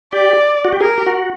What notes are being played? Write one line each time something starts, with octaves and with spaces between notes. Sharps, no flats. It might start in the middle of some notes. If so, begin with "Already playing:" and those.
G4 D5
F#4
G4
G#4 A#4
G4
F#4